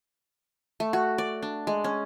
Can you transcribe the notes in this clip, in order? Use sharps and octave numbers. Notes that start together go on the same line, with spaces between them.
A3
F#4
D5
D4
G#3
C#4